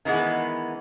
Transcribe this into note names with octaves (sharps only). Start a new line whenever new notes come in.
D#3 E3 G#3 B3